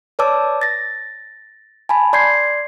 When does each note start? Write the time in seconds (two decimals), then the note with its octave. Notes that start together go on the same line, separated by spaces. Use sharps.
0.19 B4 C#5 D5 A5 D6 E6
0.61 A6 A#6
1.89 G#5 A5 B5
2.13 D5 C6 G6 G#6 C7